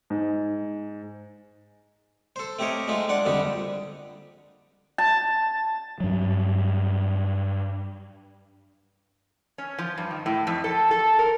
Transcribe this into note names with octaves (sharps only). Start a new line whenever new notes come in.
G#2
A4 C5
A3 C4 G4 A#4 C#5 D#5
G#3 A3 D#4 F4
D4 D5 F#5
A#1 F2 D3 G3 D#4 G4
A5
G2 F#3
C#4
F3
G2
D#3
A2
F2
A4
A4
A#4